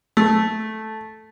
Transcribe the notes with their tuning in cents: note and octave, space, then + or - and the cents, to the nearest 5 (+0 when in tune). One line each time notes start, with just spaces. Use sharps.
A3 -5